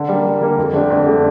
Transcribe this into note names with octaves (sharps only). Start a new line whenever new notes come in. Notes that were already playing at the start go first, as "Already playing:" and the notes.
Already playing: D3
G3 A#3
D3
G3 A#3
F2
D3 A3 D4 G4
F2
D3 A3 D4 G4